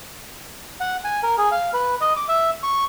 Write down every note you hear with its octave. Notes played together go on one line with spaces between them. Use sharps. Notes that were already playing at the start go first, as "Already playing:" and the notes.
F#5
G#5
A#4
G#4
F5
B4
D#5
D6
E5
C#6